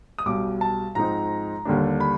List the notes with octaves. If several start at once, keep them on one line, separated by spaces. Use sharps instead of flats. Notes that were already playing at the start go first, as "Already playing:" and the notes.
D#6
B1 B2 G3 D6
A5
G#2 F3 G#3 C4 D#4 A#5
D#2 D3 G3 A#3 D4
B5